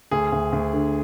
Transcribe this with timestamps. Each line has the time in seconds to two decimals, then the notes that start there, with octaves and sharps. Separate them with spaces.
0.11 D2 G#4
0.32 D2
0.53 D2
0.73 D3